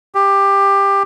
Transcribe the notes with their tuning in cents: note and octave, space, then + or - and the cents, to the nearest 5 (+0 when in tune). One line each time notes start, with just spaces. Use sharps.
G4 +15